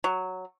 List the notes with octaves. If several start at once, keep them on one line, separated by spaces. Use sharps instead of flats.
F#3